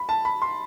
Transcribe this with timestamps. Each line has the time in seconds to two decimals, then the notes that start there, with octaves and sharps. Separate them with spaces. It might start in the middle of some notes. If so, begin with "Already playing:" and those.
Already playing: B5
0.09 A5
0.25 B5
0.42 C6